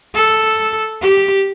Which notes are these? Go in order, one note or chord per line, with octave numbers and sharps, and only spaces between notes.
A4
G4